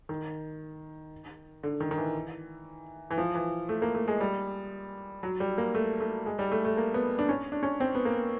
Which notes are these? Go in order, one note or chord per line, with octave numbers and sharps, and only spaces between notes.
D#3
D3
D#3
D#3
E3
E3
F3
E3
A3
A#3
A3
G#3
G3
F#3
G3
A#3
A3
A3
G#3
G3
A3
A3
A#3
B3
D4
C#4
D4
C#4
C4
B3
A#3